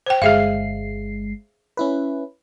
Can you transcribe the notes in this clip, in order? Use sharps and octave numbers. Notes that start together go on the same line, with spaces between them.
C5 G5
G1 G#3 G#4 E5 F5 C7
C#4 E4 B4